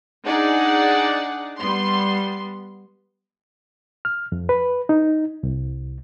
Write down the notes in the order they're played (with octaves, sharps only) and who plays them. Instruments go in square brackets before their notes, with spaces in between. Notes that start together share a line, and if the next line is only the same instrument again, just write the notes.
[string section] D4 D#4 G#4 D5 F#5
G3 B3 C6
[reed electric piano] F6
F2
B4
D#4
C2